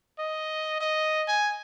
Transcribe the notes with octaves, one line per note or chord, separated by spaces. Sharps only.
D#5
D#5
G#5